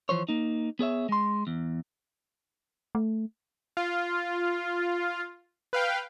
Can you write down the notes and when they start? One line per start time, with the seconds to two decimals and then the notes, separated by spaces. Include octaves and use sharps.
0.09 E3 F3 C5 C#5
0.29 A#3 D#4
0.79 B3 G#4 C#5 E5
1.09 G#3 C6
1.47 E2
2.95 A3
3.77 F4
5.73 B4 F5 G5